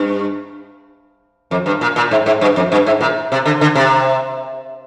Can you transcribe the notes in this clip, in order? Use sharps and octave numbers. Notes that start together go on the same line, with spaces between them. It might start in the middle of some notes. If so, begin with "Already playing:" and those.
Already playing: G2
F2
G2
A#2
A#2
G#2
G#2
G2
F2
G2
G#2
A#2
C3
D3
D3
C3